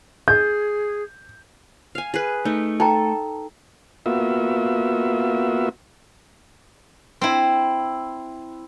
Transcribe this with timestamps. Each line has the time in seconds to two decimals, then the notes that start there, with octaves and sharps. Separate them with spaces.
0.28 G#4 G6
1.95 F5 G#5
2.14 G#4 B4
2.45 A3 D#4
2.80 D#4 A4 G5 A#5
4.06 A#3 B3 F4 F#4 E5
7.21 C4 E4